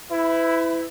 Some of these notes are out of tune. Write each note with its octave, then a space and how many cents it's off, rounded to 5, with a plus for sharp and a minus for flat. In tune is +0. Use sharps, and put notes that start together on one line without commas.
E4 +0 B4 +40